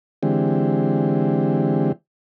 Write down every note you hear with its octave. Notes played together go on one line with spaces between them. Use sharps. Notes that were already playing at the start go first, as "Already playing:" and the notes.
D3 E3 G#3 C4 G4